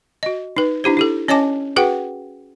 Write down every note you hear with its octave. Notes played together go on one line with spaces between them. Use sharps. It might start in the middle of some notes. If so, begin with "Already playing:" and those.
F#4 D#5
D#4 B4
D4 E4 G4 C5
E4 G4 A4
C#4 C#5 D#5 G#5 A5 D6
F#4 G#4 B4 F#5 G5